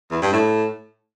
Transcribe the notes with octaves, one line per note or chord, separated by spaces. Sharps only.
E2
G2
A2